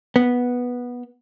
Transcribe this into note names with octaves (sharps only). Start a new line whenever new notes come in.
B3